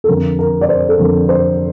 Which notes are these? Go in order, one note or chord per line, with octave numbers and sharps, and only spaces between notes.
A4
F2 D3 F3 A#4
A#4
D5
C5
A4
F2 D3 F3 A#4
C5